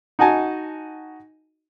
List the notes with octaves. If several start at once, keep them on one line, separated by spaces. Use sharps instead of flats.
D#4 F#4 D#5 G#5 A5